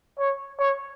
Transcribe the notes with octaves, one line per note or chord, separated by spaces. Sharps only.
C#5
C#5